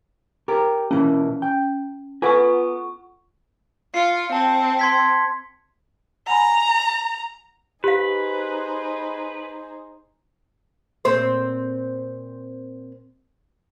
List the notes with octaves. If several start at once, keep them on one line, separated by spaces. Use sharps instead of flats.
G4 A#4
B2 E3 A#3 C#4
G5
B3 F4 B4 F#5 G#5 C#6
F4 C7 C#7
C4 A5
C6 G#6 B6
F#5 G#5 A#5 B5
D#4 G4 G#4 B4 C5 F5
A#2 C4 C5